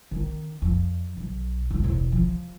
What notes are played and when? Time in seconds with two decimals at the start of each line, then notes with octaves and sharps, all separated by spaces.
0.11 D#3 C4
0.62 F2
1.17 B1
1.71 F1 G2
1.83 E1 B2
2.12 F3